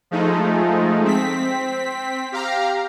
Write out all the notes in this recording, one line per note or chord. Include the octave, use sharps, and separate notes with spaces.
F3 G#3 A3 D#4
C4 B6
G4 F5 A#5